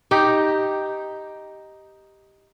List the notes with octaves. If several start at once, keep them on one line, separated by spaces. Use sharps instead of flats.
D#4 G4